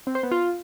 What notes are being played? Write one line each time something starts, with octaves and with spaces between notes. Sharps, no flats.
C4
C5
B3
F4